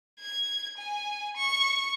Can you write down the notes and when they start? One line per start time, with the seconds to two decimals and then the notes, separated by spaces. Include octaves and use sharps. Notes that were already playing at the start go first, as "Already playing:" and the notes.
0.20 G#6
0.77 G#5
1.37 C#6